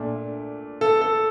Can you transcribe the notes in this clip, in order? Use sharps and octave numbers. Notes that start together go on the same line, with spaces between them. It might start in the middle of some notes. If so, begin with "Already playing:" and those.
Already playing: A#2 A3 D4
A4
A4